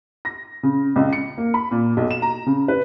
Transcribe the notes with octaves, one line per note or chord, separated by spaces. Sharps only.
A#6
C#3
C#2
C#7
A#3
B5
A#2
B1
E7
A#5
C#3
B4